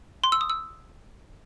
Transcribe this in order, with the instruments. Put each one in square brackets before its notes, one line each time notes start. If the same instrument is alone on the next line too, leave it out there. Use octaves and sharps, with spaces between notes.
[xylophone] C6
E6
D#6
E6